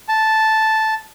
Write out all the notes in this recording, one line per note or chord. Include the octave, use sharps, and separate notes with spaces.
A5